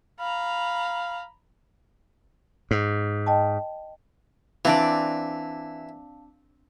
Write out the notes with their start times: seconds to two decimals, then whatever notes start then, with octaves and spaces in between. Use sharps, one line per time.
0.20 F5 A#5 B5
2.71 G#2
3.26 D#5 G5 A5
4.65 E3 C4 D4 D5 F5 A5